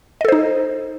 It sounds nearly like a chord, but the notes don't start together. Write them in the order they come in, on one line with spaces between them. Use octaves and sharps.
D#5 A4 C5 D#4